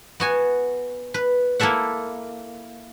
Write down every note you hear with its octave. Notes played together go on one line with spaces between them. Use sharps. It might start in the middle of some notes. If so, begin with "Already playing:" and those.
B3 F#4 G#5
B4
A#3 E4 A4 E5 F#5